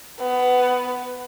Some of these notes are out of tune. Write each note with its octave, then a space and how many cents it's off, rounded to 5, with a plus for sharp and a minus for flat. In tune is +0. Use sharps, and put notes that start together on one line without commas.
B3 +15